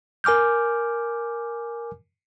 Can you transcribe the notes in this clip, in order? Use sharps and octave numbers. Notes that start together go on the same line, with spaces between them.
A#4 G#5 D6 F6 G6